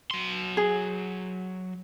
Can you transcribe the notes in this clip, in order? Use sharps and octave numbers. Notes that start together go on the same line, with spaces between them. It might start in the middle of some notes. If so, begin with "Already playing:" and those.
F#3 C6
G#4